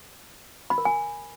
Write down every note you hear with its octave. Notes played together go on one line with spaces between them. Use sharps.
B5
A#4
G#5